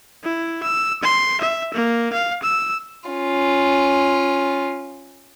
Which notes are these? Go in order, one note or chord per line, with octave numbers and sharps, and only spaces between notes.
E4
E6
C6
E5
A#3
F5
E6
C#4 F4